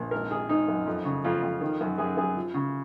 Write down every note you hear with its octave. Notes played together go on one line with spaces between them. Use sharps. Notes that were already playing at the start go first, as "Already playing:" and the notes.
Already playing: A#1
G#1 A#4
G#1 G#4
G#1 D#4
F#2
F2
C#3
F2 F4
F2
D#3
F#2
F#2 G#4
F#2 G#4
F3
C#3